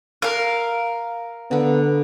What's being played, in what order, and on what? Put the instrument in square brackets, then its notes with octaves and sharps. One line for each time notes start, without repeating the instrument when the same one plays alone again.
[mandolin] A#4 F5 [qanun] E5
[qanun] D3 A4 [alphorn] B3